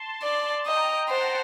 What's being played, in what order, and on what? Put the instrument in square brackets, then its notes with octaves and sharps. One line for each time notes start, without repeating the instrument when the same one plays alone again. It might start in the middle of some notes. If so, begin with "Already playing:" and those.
Already playing: [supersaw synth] A5 C6
[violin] D5
[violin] D#5 [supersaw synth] G5 A#5
[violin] C5 [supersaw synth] F#5 A5